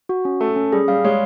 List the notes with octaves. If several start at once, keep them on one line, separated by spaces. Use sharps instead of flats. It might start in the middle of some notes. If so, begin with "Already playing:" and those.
F#4
C#4
A3 A4
C#4
G3 G#4
G3 F5
G#3 C#5